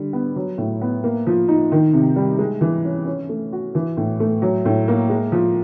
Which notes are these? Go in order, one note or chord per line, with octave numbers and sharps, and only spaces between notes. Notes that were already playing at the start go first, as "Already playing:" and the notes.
Already playing: D3 G3
B3
F#3
A2
B3
A#3
F3
D#4
D#3
C3
G3
G#3
E3
C#4
C#4
A3
F#4
E3
A2
A3
F#3
A2
A#3
G#3
F3